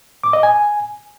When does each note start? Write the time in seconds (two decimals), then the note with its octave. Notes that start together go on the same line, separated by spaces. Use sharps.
0.24 D6
0.33 D#5
0.43 G#5